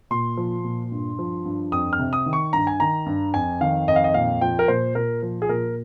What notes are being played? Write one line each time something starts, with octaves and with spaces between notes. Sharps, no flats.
A#2 C6
F3
A#2
G2
F3
G2
F2 D#6
F6
C3
D#6
D#3
C#6
G2 A#5
G#5
D#3 A#5
G2
F2 G#5
D#3 F5
F2 D#5
F5
D#5
A#2 F5
F3 G5
A#4
A#2 C5
A#2 A#4
F3
G#4
A#2 A#4